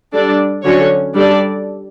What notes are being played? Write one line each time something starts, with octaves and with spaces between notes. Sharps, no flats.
G3 D4 A4 D5
D3 F#3 C#4 F#4 C#5
G3 D4 A4 D5